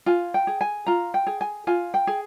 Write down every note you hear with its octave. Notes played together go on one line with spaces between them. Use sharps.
F4 G#5
G5
G#4
G#5
F4 A#5
G5
G#4
G#5
F4 G#5
G5
G#4